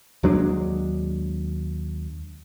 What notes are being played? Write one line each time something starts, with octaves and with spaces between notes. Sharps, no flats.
D#2 F#3 G#3 D4